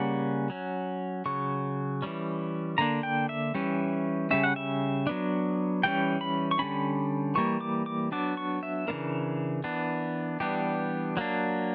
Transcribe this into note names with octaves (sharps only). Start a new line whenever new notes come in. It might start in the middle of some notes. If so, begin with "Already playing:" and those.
Already playing: C#3 G3 A#3 C#4 F#5
F#3 C#4
C#3 F#3 C#6
E3 G3 C#4
D3 A#3 D4 A#5
G5
E5
E3 G3 C#4
C#3 G3 C#4 E5
F#5
E5
F#3 B3 D4
E3 G3 C#4 G5
B5
C#6
D3 G3 C#4 B5
E3 G3 A#3 C#6
D6
D6
F#3 B3 D4 D6
C#6
E5
C#3 E3 B3 D4 A#4
E3 B3 D4
E3 G3 B3 D4 G4
F#3 A#3 D4